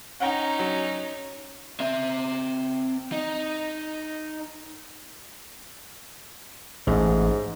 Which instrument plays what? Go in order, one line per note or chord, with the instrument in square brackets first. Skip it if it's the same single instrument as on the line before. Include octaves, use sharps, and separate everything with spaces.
[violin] C#4 D#4 [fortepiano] F#5 G5 A#5
[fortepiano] F#3
[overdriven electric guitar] C4 E5
D#4
[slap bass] A1 [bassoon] G#2